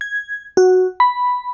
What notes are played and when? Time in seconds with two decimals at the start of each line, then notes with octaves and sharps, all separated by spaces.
0.01 G#6
0.57 F#4
1.00 B5